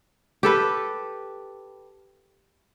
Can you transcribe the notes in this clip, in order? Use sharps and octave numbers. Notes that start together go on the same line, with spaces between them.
G4 A4 B4